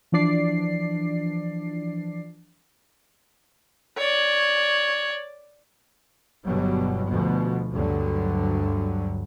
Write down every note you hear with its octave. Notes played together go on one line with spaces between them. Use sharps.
E3 F3 D4 D5 C7
C#5 D5
G1 B2 F#3 G3
D2 B2 F3
D2 G2 D3 F#3